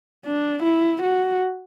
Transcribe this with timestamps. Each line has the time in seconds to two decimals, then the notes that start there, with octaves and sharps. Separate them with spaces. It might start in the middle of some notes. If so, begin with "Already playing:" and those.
0.26 D4
0.64 E4
1.03 F#4